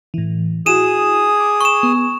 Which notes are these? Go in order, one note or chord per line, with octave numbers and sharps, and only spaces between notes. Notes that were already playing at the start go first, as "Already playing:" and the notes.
A2 E3
E4 F#4 G#4 D#6 D#7 E7
D6 G#6
C#6 E7
B3